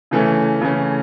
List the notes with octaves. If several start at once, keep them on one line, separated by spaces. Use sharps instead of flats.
C#3 E3 A3 C#4
C#3 E3 A3 C#4